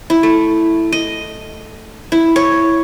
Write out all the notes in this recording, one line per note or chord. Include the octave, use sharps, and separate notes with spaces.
E4
A3
D#5
E4
C#5